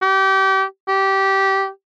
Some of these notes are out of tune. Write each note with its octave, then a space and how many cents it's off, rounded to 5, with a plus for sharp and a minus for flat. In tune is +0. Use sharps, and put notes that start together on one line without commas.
G4 -30
G4 -15